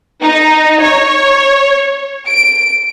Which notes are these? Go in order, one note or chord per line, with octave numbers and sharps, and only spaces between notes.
D#4
C#5
D7